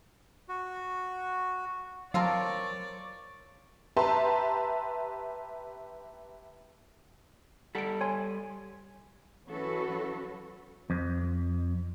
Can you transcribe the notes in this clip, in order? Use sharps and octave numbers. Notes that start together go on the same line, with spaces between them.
F#4
F#3 C4 F4 A#4 C#5 D5 F5 A5
G4 B4 E5 A5 A#5 C6
G3 A4 F#5 B6 D7
C#5 G#5 C6
E3 F#3 C#4 F#4 A4 B4
F2